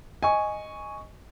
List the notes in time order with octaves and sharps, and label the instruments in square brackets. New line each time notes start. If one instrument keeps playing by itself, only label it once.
[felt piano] D#5 C#6 [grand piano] G#5